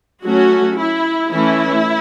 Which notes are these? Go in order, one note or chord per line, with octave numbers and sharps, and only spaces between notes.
F#3 A3 C#4 F#4
E4
E3 A3 C#4 E4